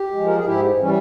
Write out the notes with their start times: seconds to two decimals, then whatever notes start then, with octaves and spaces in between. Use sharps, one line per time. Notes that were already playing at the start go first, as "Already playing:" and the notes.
Already playing: G4
0.12 G#3
0.17 F3
0.26 A#4
0.35 G#4
0.45 G#2 E4 G4
0.79 E3 G3 C#4